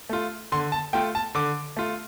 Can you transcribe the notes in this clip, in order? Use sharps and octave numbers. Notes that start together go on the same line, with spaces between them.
A3 F4
D3 C6
A5
A3 F4 G5
A5
D3 D6
A3 F4